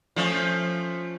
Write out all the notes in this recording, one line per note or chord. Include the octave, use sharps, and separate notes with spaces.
F3 A3 C#4